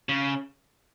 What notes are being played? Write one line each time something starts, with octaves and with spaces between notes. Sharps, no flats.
C#3